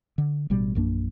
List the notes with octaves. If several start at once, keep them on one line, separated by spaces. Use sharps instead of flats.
D3
A1 B2 G3
A#1 F#2 A#3 D4